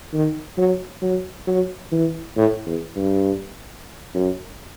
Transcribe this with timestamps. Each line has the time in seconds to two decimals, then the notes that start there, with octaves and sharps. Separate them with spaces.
0.13 D#3
0.58 F#3
1.02 F#3
1.47 F#3
1.92 E3
2.37 A2
2.66 E2
2.96 G2
4.15 F#2